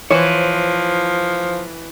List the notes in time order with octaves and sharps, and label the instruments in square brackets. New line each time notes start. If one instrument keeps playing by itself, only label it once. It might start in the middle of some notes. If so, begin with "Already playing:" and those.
[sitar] E3 [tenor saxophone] F3 [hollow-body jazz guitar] C5 C#5